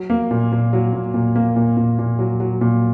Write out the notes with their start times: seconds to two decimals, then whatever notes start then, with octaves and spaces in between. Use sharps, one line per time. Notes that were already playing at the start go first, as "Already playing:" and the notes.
Already playing: F#3
0.10 A#3
0.31 A#2
0.52 A#2
0.73 F#3
0.93 A#2
1.14 A#2
1.36 A#3
1.56 A#2
1.77 A#2
1.99 A#2
2.19 F#3
2.40 F#3
2.61 A#2